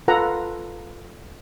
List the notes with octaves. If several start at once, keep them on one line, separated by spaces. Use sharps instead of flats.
F4 A4 B4 F#5 A#5